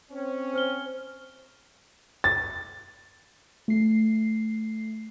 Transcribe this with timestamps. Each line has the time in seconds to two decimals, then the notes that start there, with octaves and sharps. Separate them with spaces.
0.11 C4 C#4
0.53 C5 F6 G7
2.24 A6
3.68 A3 C7